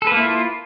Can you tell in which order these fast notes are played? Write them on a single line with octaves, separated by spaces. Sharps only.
A4 B4 A#3 E4 F4